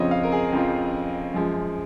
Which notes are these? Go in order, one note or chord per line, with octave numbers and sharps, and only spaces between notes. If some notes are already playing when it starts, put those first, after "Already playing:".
Already playing: F2 C#3 F3 C4 F4 C#5 D#5
F5
A#4
G#4
F2 C#3 F3 C4 F4
F#2 F3 G#3